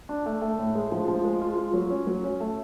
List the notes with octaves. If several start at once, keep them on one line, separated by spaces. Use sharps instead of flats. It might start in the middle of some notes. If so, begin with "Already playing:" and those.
D4
A3
A3
A2
G#3
F3
F3
G#3
F4
F4
F#3
C#4
F#3
C#4
A3